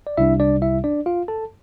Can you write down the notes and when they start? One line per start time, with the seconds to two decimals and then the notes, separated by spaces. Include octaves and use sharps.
0.07 D5
0.17 C2 C3 G3 D4 E4 E5
0.40 D4 D5
0.62 E4 E5
0.84 D4 D5
1.06 F4 F5
1.28 A4 A5